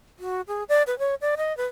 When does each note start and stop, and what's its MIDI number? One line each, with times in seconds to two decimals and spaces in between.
0.19 0.41 66
0.48 0.63 68
0.69 0.83 74
0.87 0.97 71
0.99 1.15 73
1.21 1.35 74
1.37 1.55 75
1.57 1.66 71